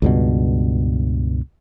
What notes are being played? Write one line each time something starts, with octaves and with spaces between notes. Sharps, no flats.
C#2 G2 B2